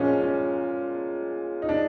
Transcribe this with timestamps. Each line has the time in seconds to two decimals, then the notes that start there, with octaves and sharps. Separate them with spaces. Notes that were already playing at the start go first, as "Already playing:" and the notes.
Already playing: A#2 F3 G#3 C#4
0.22 C#4
1.62 D#4
1.69 D4